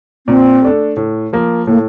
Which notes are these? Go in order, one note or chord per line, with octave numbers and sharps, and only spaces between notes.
A#2 C4
A3 D4 A4
A2
F3 A#3
A2 A#3